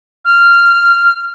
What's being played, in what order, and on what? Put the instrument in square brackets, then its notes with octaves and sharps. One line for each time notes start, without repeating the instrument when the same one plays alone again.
[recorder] F6